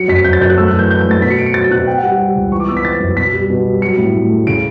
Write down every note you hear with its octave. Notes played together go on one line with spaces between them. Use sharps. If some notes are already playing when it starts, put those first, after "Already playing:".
Already playing: F#3 C#7
F#2 B6
F#2 G6
A6
F#2 G6
F#6
A3 E6
F#6
E3
G6
E3 G6
G6
A3 A6
B2 B6
C#7
B3 D7
C#7
F#3 A6
B2 F#6
B3 G5
F#5
G3
F#5
G3
C#2
E3 C#6
D6
B3 E6
B6
E3 A6
F#2
B2 B6
G3
B2
G3
F#3 C#7
A2
A2
A3
C#3 D7